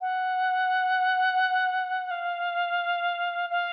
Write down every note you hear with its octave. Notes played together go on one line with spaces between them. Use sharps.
F#5
F5
F5